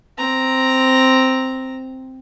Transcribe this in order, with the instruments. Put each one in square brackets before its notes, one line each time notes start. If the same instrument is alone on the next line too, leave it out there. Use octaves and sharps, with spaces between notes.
[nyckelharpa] C4 A#5